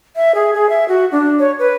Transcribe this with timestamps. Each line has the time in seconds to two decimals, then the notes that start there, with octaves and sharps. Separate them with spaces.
0.16 E5
0.35 G#4
0.54 G#4
0.70 E5
0.88 F#4
1.12 D4
1.39 C#5
1.59 B4